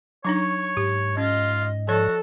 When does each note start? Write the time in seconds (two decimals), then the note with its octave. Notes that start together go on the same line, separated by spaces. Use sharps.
0.25 F#3 D4 D#4 C#5 C#6
0.77 G#2 G4
1.17 C#4 F4 D#5
1.88 F3 F#4 A4 C#5 D5